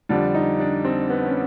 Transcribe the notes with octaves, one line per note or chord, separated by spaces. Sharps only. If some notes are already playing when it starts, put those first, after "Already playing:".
F2 D3 G3 D4
D#4
D4
C4
B3
C#4